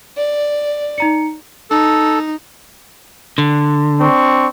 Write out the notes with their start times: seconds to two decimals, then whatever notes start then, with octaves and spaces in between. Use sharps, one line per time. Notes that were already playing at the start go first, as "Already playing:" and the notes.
0.17 D5
0.98 D#4 A#5 C#7
1.71 D#4 A4
3.38 D3
4.00 C4 D4 C#6